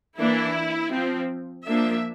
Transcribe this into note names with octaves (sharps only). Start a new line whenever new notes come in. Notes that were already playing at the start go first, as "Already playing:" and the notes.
E3 A#3 D4 E4
F3 C4
F3 A#3 D4 E5